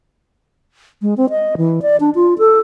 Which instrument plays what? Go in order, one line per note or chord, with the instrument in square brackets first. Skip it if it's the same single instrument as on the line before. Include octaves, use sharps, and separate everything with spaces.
[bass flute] G#3
C4
D#5
E3
D5
D4
F4
A4